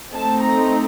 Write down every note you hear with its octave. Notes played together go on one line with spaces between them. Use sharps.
A3 C4 D#4 A5
A#5